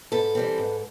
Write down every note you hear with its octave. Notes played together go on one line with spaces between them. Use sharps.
G#2 A4 B4
E3 G3 C4
G#2